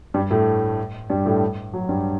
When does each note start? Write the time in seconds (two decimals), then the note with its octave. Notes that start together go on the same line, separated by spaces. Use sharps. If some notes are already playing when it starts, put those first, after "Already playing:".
0.14 G2 G3
0.31 A2 A3
1.10 G2 G3
1.26 A2 A3
1.73 F#3
1.89 G2 G3